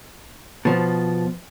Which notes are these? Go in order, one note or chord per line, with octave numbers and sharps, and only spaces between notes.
B2 F3